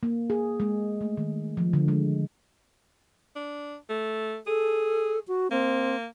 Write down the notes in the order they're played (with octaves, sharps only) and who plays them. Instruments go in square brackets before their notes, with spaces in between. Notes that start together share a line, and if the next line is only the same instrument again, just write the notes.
[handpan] A#3
G#4
G#3
A3
D#3
F3
D3
G#3
[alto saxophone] D4
A3
[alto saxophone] G#4 [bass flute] A4
[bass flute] F#4
[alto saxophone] A#3 [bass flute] C4